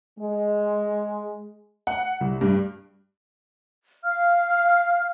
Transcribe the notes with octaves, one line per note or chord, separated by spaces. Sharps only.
G#3
F#5
C2
G2
F5 F6